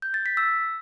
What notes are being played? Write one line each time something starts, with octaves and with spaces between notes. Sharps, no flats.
G6
A6
B6
E6